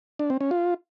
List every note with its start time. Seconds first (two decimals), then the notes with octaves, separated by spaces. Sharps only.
0.19 D4
0.30 C4
0.41 C#4
0.51 F4